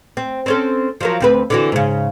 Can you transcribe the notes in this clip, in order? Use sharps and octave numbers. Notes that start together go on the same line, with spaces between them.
C4
C4 C#4 A4
F3 F#3 A#4
D2 C4 B4
D3 E3 F#4
G#2 C#3